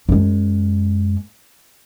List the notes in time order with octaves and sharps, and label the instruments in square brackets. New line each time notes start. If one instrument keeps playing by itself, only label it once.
[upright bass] F#2 G#3